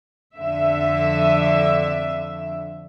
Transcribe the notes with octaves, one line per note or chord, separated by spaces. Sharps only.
F2 D3 E5